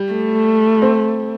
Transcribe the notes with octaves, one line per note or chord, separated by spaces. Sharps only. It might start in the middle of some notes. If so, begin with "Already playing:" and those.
Already playing: G3
A3
C4